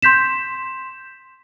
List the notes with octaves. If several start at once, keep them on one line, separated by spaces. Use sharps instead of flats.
C6 G6 B6 E7